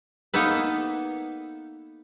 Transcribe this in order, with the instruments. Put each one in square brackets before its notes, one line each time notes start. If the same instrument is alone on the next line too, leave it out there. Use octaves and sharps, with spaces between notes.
[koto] A#3 B3 D#4 A4 B4